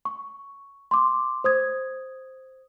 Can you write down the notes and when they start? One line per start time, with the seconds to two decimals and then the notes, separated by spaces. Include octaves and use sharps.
0.05 C#6
0.91 C6 D6
1.44 C5 D#6 G#6